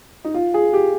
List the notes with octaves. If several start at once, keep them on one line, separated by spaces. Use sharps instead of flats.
D#4
F4
G#4
G4